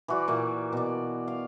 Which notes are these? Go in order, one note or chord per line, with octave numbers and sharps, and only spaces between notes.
E3 F#4 D5
A#2 E3
B2 D5
F5